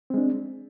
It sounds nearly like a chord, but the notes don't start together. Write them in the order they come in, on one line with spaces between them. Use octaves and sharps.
C4 G#3 D4